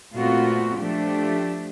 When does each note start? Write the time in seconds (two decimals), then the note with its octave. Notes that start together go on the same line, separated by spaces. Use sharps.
0.14 A#2 A3 B3 C4 F4 F#4
0.78 F3 A3 D4 G4